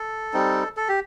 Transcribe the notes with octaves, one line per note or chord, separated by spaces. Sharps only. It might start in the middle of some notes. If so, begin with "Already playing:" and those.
Already playing: A4
G3 C4 D#4
A4
G4